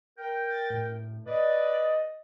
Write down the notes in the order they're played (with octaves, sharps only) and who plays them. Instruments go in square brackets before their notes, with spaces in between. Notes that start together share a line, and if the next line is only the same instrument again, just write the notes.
[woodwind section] A#4 G5
[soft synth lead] A6
A2
[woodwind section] B4 D5 [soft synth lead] D#5